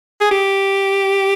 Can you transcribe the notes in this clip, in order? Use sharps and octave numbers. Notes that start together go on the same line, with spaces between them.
G#4
G4